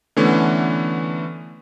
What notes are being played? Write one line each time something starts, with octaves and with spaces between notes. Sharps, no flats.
D3 E3 A3 B3 C#4